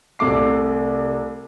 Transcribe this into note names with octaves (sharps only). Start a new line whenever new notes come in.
C2 C3 A3 D6 C7